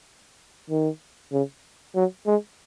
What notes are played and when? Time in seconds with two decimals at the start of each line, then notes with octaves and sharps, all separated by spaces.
0.70 D#3
1.32 C#3
1.95 F#3
2.27 G#3